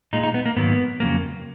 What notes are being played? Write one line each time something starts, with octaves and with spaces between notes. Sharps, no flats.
A#2 G#3 D#4
D#4
B3
A#3
G#2 D#3 F#3 A#3 B3
F2 C#3 F#3 A#3